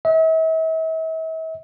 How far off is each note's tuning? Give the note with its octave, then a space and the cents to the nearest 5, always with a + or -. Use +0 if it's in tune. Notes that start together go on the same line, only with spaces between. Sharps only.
E5 -40